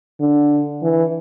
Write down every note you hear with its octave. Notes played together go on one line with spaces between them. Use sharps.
D3
E3